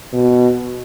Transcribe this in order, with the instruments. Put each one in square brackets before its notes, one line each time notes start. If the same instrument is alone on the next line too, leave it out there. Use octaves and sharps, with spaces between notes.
[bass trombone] B2